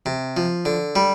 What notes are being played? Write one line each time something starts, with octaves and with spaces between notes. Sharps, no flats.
C3
F3
D3
G3